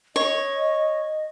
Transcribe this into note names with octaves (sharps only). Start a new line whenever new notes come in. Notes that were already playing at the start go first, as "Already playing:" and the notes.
C#5 D#5